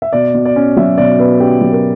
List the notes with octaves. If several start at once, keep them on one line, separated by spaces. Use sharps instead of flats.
E5
B2 D5
B2
D5
C#4
F#3 E5
B2 D5
B2 B4
C#4 G4
F#3
A#4